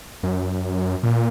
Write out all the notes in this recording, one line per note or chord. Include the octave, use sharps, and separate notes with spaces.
F#2
A#2